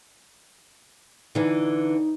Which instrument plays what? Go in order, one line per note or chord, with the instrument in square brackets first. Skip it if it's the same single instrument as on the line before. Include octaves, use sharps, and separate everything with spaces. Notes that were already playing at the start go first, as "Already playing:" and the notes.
[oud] D3 E3 [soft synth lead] D#4